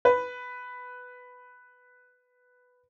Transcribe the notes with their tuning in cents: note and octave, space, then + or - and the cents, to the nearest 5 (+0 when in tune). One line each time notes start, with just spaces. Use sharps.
B4 +5